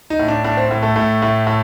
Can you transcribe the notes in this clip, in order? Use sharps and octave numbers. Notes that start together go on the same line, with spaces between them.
D#4
A2
D4
A2 D4
C4
A2
A3
A2 A3
A2
A2